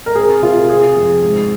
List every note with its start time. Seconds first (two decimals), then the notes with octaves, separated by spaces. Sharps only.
0.06 A#4
0.15 C4 G#4
0.42 C3 F4
0.69 C4 G#4
0.97 F2
1.23 G#2